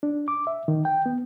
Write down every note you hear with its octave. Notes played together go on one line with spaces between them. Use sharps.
D4
D6
E5
D#3
G5
B3